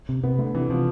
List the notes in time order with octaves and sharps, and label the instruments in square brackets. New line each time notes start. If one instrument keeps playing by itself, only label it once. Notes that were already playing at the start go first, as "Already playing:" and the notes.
[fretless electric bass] C3
[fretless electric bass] C3 [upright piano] B3
[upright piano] D3 [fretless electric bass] A3
[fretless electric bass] C3 [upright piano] E3
[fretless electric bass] C3 [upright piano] F3